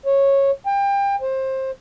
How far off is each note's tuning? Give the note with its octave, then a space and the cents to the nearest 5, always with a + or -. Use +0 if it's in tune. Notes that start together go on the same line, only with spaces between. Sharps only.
C#5 -10
G5 +30
C5 +20